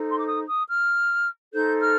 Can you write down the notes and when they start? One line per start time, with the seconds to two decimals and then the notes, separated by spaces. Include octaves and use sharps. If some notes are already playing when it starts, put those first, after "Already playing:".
Already playing: D#4 A4 C5
0.10 C6
0.18 D6
0.26 D#6
0.48 D#6
0.69 F6
1.52 D#4 A4 C5 G6
1.80 F6